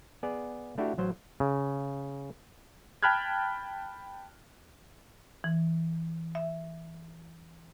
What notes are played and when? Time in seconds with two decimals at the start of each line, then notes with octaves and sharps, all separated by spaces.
0.23 B3 G#4 D5
0.78 A3 D4 E4 F#4 G4
0.97 A1 F#3 C5
1.40 C#3
3.03 G5 A5 B5 F6 F#6 G#6
5.44 E3
6.35 E5